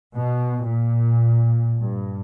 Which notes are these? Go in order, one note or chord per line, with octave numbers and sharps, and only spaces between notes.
B2
A#2
G2